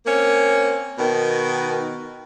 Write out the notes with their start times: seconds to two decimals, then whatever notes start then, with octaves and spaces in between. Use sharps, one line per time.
0.06 A#3 C4 C#4
0.98 B2 D#3